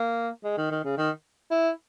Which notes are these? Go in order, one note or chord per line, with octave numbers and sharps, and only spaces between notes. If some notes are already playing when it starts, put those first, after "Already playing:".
Already playing: A#3
G#3
D#3
D#3
C#3
D#3
E4